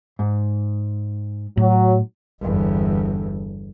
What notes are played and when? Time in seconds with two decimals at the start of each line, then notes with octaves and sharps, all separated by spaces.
0.19 G#2
1.57 A2 F#3
2.41 G1 E2